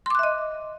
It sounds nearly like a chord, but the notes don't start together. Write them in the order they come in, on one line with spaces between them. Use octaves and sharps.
C6 D6 F#6 E5 D#5